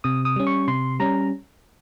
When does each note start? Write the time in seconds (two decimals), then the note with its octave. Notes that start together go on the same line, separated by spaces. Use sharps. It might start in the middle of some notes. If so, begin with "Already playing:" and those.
0.04 C3 D#6
0.25 D#6
0.36 G3 C#4
0.47 C#6
0.68 C3 C6
0.99 G3 C#4 A#5